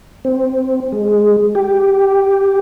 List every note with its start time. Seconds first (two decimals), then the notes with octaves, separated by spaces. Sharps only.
0.25 C4
0.92 G#3
1.55 G4